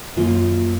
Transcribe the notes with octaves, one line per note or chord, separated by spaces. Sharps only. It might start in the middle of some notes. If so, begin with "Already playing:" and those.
F#2 D#3 A#3 F4